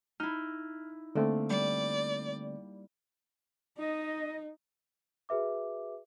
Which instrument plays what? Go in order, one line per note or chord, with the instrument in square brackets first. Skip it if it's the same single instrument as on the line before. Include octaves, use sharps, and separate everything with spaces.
[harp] D#4 E4 [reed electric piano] F6
[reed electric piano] D3 A3 C4 [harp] A#3
[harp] G3 [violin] D5
[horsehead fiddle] D#4 [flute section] D#5
[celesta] F#4 G#4 B4 E5 D6